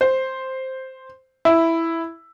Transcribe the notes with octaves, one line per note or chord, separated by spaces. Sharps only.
C5
E4